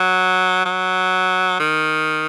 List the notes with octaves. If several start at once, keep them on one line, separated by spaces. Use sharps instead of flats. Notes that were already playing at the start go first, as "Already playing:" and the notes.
Already playing: F#3
F#3
D#3